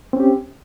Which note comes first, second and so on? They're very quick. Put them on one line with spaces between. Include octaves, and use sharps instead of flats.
C4 C#4 G4